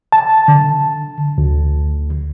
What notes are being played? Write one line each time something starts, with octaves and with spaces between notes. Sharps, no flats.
A5
D3
D2